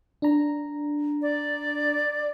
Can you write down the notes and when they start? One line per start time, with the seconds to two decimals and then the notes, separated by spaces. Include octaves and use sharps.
0.22 D4 A#5
1.22 D5